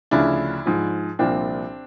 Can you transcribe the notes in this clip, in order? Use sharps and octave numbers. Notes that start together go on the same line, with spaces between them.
D2 C#3 F3 D4 E4
G#2 F3
C2 A#2 F3 C4 D4